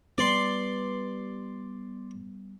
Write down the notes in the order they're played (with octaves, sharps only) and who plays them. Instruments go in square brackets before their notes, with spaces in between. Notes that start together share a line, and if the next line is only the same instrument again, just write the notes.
[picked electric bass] G3 G#3 B3 [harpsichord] D5 C6